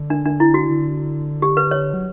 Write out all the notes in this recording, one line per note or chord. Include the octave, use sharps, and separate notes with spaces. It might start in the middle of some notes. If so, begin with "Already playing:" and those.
Already playing: D3
D4
D4
E4
F#4
D3
G4
B4
C#5
F#3